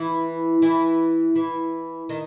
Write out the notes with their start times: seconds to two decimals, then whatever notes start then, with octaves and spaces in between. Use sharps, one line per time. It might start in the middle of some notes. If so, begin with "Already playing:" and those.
Already playing: E3 E4
0.62 E3 E4
1.36 E3 E4
2.09 D#3 D#4